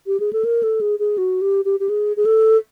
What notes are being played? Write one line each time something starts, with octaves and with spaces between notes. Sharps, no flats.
G4
G#4
A4
A#4
A4
G#4
G#4
F#4
G4
G4
G4
G#4
G#4
A4